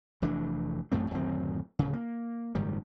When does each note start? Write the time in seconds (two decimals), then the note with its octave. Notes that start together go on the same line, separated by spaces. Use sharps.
0.22 F1 E3 A3 D4
0.92 A1 F#2 A3 C4
1.11 D1 F#2 D#3 C4
1.79 D1 C#3
1.93 A#3
2.55 F#1 G#2 D#3 G3